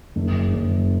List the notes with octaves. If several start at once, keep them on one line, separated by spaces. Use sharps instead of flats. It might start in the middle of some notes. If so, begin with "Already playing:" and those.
F#1
F#1